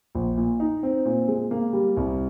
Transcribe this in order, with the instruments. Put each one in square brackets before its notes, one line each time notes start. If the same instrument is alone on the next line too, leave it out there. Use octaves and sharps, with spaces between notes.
[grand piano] A#1
A#2
D#4
C4
A#2
G#3
A#3
G3
C2